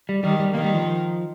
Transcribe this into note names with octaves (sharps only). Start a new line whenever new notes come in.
G3
D#3 G3
G3
D#3 A#3
G3
F3